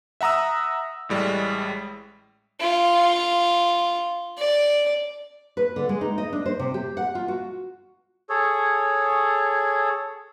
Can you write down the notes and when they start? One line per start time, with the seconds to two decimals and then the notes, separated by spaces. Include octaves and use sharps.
0.21 E5 F#5 A#5 D#6 E6
1.09 A1 A2 G3 G#3
2.61 F4
4.38 D5
5.57 B4
5.76 D3
5.89 G#3
6.01 D#4
6.18 D#5
6.33 D4
6.46 C5
6.59 C3
6.74 G4
6.97 F#5
7.15 F4
7.28 F#4
8.29 G#4 A4 C#5